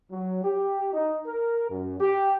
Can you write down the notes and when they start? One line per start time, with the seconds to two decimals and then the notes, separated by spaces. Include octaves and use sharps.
0.12 F#3
0.44 G4
0.93 D#4
1.26 A#4
1.69 F#2
2.01 G4